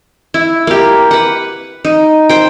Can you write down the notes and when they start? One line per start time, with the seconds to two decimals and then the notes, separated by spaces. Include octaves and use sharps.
0.34 E4
0.67 A#3 G4
1.11 B4 F#5
1.85 D#4
2.29 C5 G5